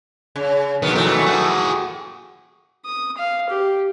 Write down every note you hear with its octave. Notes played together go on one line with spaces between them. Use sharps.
C#3
D#3 F#3 B3
E3 A3
F#4 G#4
D#6
F5
G4